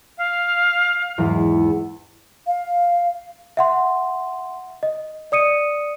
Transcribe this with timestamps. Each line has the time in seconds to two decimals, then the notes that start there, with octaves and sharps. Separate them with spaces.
0.18 F5
1.18 E2 G#2
2.47 F5
3.57 E5 F#5 C6
4.83 D#5
5.32 D5 D#6 C#7 D#7